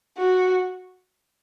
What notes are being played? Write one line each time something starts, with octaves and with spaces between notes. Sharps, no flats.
F#4